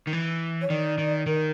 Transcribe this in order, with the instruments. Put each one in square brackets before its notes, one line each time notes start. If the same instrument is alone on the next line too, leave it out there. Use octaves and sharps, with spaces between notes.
[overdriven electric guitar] D#3
E3
[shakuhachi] C#5
[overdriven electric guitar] D#3 [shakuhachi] D5
[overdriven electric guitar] D#3
[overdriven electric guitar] D#3 [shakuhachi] A#4